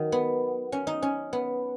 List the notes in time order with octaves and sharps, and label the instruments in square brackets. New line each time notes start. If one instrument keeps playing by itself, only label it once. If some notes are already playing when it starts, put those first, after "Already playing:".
Already playing: [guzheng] D#3 F#3
B3
C#4
D#4
C#4
B3